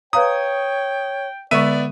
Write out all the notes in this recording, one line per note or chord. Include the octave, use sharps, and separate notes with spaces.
B4 C#5 F5 G5 A#5 D#6
D3 G#3 B3 D5 E5 C#6 D#7